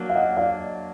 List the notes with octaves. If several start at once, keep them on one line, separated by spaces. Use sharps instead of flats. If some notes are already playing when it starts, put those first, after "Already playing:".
Already playing: F#3 A#3 D4
F5
D#5 F#5
D5 F5